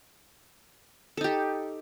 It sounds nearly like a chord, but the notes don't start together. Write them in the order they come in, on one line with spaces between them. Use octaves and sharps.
A4 D#4 G4